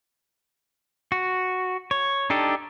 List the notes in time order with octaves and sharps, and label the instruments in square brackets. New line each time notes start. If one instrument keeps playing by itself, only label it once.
[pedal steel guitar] F#4
C#5
D4 D#4 G4 A4